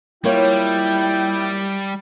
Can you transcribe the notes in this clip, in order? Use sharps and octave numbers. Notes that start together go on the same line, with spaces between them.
G3 A#3 E4 F4 C#5 G5